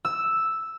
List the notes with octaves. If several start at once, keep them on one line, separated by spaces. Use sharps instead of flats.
E6